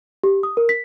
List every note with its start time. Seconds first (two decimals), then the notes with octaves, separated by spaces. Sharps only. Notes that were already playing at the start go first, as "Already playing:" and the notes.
0.24 G4
0.43 D#6
0.57 A#4
0.69 B6